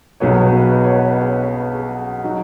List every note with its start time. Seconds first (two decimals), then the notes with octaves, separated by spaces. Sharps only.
0.20 B1 B2 F#3 B3 G#4 C#5
0.34 G#4
0.46 B4
0.58 B4
0.71 B4 D#5
0.84 C#5 F#5
0.96 B4 D#5
1.09 B4
1.21 G#4 C#5
1.47 B4
1.73 G#4
2.24 F#3 D#4